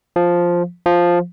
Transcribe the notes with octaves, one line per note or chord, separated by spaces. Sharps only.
F3
F3